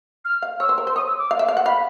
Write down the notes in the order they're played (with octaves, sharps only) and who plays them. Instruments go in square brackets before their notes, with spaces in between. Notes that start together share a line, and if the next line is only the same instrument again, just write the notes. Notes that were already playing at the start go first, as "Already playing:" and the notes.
[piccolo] F6
[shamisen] F5
[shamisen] C#5 [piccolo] E6
[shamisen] C5
A#4
C5
[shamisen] C#5 [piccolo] D#6
[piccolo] E6
D6
[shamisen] F5
E5
F5
F#5
[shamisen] F5 [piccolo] B5